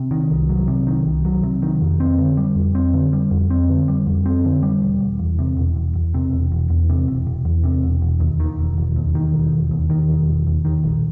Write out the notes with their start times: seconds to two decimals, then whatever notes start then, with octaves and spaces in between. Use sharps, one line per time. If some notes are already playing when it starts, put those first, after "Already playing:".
Already playing: C3
0.11 D#3
0.31 C2
0.49 F#3
0.68 C3
0.87 D#3
1.06 C2
1.25 F#3
1.43 C3
1.62 D#3
1.81 F2
2.00 C4
2.18 D3
2.37 G3
2.56 F2
2.75 C4
2.94 D3
3.13 G3
3.31 F2
3.50 C4
3.69 D3
3.88 G3
4.06 F2
4.26 C4
4.45 D3
4.63 G3
4.82 E1
5.01 E1
5.19 E2
5.39 C3
5.57 E1
5.76 E1
5.95 E2
6.14 C3
6.33 E1
6.52 E1
6.70 E2
6.90 C3
7.08 E1
7.27 E1
7.45 E2
7.64 C3
7.83 E1
8.02 E1
8.20 D#2
8.40 D#3
8.59 E1
8.78 E1
8.96 D#2
9.15 D#3
9.34 E1
9.53 E1
9.71 D#2
9.90 D#3
10.09 E1
10.28 E1
10.47 D#2
10.65 D#3
10.84 A#1